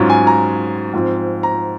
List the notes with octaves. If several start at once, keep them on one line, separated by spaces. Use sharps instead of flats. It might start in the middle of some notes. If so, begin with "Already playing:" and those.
Already playing: G#2 F#3 C#4 F4
G#5
A#5
G#2 F3 C4 F4
A#5